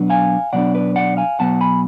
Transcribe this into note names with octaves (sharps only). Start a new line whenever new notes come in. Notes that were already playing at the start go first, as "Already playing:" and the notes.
Already playing: B2 F#3 B3 D4
F5 G#5
B2 F#3 B3 D4 D5 F#5
B4 D5
D5 F#5
F5 G#5
B2 F#3 B3 F#5 A5
G#5 B5